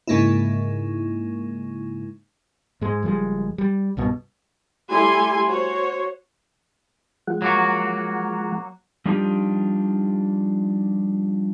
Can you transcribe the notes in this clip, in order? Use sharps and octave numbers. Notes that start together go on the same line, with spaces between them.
G#2 C#3 G#3 A#3 D#4 E4
G#2 G#3
F#1 F3 G3 G#3
G3
C2 G2 B2
G3 A3 E4 G4 G#5 C6
F#4 C5 C#5
F3 G#3 F#5
F#3 A#3 F#4
F3 G3 D4 D#4 F4 G4